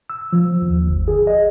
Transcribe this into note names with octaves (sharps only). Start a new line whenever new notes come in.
E6
F3
D#2
G1
G#4
D#5